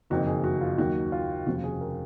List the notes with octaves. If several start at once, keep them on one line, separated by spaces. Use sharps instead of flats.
F#1 F2 D#3 F#4
G#4
F#4
F4
D#2 D#3 F#3 F#4
F4
F1 D#2 C#3 F3 F#4
G#4
A#4